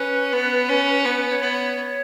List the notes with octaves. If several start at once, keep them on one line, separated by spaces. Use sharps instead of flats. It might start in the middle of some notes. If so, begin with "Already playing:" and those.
Already playing: C#4 B4
B3
C#4
B3 B4
C#5
B3
C#5